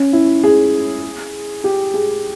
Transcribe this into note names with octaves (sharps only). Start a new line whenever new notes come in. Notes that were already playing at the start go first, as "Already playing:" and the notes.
Already playing: C#4
E4
G#4
G4
G#4